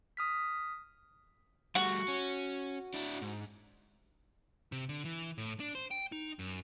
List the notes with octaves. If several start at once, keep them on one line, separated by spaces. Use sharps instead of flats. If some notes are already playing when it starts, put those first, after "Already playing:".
D#6 F6 B6
G3 A3 F#4
C#4
D4 E4
G#2
C3
D3
E3
A2
D4
C5
G5
D#4
F#2